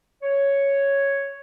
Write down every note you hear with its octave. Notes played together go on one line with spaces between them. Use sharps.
C#5